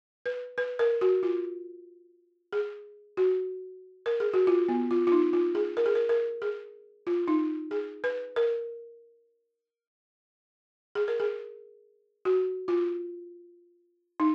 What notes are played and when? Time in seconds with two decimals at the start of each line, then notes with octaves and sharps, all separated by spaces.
0.26 B4
0.58 B4
0.79 A#4
1.01 F#4
1.23 F4
2.53 G#4
3.17 F#4
4.06 A#4
4.20 G#4
4.34 F#4
4.47 F4
4.68 B3
4.91 F4
5.07 F4
5.12 D#4
5.33 F4
5.55 G#4
5.77 A#4
5.86 G#4
5.95 A#4
6.09 A#4
6.42 G#4
7.07 F4
7.28 D#4
7.71 G#4
8.04 B4
8.36 A#4
10.95 G#4
11.08 A#4
11.20 G#4
12.25 F#4
12.68 F4
14.20 D#4